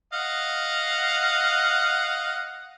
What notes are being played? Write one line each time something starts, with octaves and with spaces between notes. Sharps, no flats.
D#5 F5 F#5